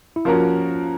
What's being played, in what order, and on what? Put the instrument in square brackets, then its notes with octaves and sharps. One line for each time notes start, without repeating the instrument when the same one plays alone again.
[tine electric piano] E4
[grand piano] F3 A#3 C#4 F#4 A#4 [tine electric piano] F4